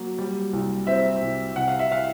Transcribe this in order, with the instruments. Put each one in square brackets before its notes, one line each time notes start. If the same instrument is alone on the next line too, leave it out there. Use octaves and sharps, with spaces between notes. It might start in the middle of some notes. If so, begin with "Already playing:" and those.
Already playing: [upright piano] F#3 A#3
G3
C2
C4 E5
C2
C3 F#5
F5
E5
F5